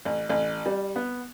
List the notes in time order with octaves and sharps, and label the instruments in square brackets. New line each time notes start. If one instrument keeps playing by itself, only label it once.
[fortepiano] A1
A1
G3
B3